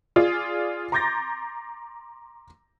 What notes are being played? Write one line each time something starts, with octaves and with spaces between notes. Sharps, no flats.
F4 G#4 D5
A#5 C6 D6 G6 A6 A#6